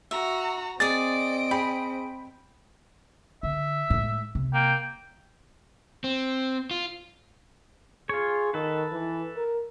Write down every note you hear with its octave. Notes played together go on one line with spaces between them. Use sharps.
F#4 E5 A#5
C4 G#4 D5 D#5 D#6 A6 D7
G#4 G5 B5
D3 E5
A2 G#3
C3
A#3 G5
C4
F4
F4 G#4 C#5
D#3 A4 B4
E3
A#4